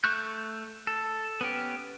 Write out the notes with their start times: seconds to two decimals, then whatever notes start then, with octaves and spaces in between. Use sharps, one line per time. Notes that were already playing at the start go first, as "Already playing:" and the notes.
0.04 A3 C#6 F#6 G6
0.87 A4
1.41 B3 C#4 G4